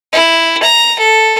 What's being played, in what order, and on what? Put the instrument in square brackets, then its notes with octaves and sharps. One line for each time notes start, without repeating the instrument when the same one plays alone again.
[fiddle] E4
A#5
A4